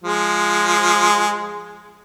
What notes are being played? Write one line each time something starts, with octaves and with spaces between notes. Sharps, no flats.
F3 G#3